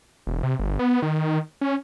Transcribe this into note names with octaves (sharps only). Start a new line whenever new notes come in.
E1
C3
G1
B3
D#3
C#4